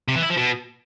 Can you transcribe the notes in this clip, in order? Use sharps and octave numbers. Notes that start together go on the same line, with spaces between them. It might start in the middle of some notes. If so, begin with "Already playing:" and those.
C3
E3
E4
F3
B2